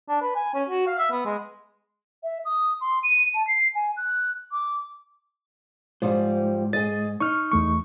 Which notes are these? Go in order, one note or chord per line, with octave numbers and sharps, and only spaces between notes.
D4
B4
G#5
C#4
F#4
F5
E5
B3
G#3
E5
D#6
C6
D#7
A5
C7
G#5
F#6
D6
G#2 F3 G3
G#4 D#5 A6
D#4 C#6 F6
E2 A3 C#6